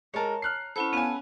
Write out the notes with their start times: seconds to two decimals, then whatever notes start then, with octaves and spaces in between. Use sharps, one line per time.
0.14 G#3 A#4 C#5 A5 A#5
0.42 F6 F#6 C7
0.76 C#4 E4 A4 B4 C5 F#5
0.93 B3 C#4 F5 G#5 A5